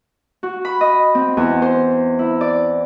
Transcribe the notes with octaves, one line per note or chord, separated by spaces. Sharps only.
F#4
B5
D#5
C4
E2
C5
E4
D5